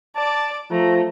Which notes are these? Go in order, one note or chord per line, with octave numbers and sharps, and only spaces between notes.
D5 A5 D6
F3 A3 A#5